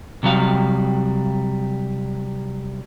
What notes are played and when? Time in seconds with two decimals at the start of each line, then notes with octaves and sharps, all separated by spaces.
0.23 C3 F#3 G3 F5